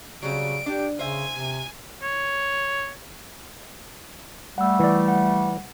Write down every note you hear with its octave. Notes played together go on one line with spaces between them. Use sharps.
C#3 F#3 G3 C4 D7
D4 G4
C#3 C5 E5 G#5
C3
C#5
G3 A3 F#5 E6
E3 D5
F#5